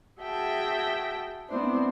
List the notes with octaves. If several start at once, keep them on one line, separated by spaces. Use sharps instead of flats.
F#4 G#4 E5 G5 A5
B3 C4 D4 E4 C5